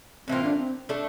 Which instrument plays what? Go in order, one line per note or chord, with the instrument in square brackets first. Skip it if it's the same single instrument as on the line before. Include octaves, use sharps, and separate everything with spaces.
[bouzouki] A2 E3 A#3 F4 [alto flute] C4
[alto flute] D4
C4
[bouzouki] A3 D4 A4